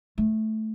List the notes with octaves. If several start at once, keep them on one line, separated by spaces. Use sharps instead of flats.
A3